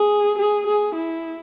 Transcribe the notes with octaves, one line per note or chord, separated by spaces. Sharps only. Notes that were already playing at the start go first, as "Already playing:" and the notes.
Already playing: G#4
G#4
G#4
E4